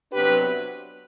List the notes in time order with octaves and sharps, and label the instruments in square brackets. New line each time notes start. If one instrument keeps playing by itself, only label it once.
[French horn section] C3 F#3 B3 D4 G4 B4